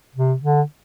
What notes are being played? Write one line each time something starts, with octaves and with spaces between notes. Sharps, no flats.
C3
D3